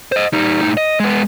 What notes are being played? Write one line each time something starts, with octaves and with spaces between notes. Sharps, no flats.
C5 D#5
G3 D#4
A2 D#4
D#5
G#3 B3